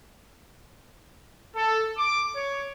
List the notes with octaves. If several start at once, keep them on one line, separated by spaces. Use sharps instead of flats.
A4
D6
C#5